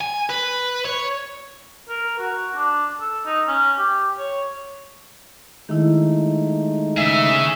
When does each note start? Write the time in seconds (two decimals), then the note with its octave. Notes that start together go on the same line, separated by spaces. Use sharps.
0.01 G#5
0.30 B4
0.85 C#5
1.89 A#4
2.19 F#4
2.56 D4
3.01 A4
3.26 D#4
3.47 C#4
3.78 G4
4.18 C#5
5.69 D#3 G#3 A3 D#4 E4
6.97 C#4 G#4 E5